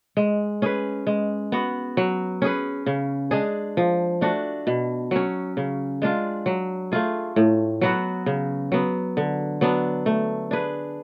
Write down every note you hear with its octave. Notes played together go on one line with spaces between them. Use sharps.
G#3
C#4 G#4 B4
G#3
B3 F#4
F#3
C#4 G#4 B4
C#3
G#3 D4 G#4
F3
A3 D4 F#4
B2
F#3 C#4
C#3
G#3 D4 F4
F#3
A3 F4 G#4
A2
F#3 B3 F#4
C#3
F#3 B3
D3
F#3 B3 D4
A3
D4 G#4 B4